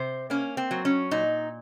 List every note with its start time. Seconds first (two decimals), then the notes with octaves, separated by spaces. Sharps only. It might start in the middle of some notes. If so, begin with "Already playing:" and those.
Already playing: C3 C5
0.30 A#3 C#4
0.57 C4
0.71 F#3
0.85 C#4
1.11 A#2 D#4